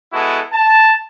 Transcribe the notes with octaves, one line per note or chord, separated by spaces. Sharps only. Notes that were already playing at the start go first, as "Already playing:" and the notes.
G#3 B3 E4 F#4 A4
A5